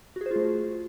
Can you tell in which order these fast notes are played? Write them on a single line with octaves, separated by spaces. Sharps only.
F#4 G#4 C5 F4 A3